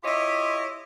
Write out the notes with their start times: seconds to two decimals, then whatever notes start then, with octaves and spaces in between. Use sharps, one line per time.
0.03 E4 F4 G4 C#5 D#5